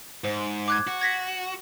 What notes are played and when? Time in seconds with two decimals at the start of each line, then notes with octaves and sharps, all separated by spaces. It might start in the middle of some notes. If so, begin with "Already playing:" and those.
0.24 G#2 C5
0.68 D6 F#6 G#6
0.87 F#4
1.01 G#6 A#6 B6